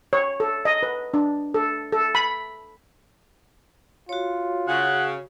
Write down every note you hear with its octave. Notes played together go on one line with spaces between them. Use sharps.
C#5
A4
D#5
B4
D4
A4
A4
B5
F4 F#4 C#5
C#3 F#5